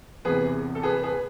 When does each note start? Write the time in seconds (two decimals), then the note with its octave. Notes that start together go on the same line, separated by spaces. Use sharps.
0.25 E1 E2 C3 E3 G#4 B4
0.75 A4
0.83 G#4 B4
1.03 G#4 B4